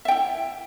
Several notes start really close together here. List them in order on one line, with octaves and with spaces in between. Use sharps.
E5 G5 E4